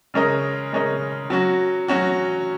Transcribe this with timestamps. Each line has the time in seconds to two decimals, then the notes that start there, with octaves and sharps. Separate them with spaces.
0.14 C#3 G#3 C#4 A#4 D#5
0.73 C#3 G#3 C#4 A#4 D#5
1.30 F#3 C#4 F#4
1.88 F#3 C#4 F#4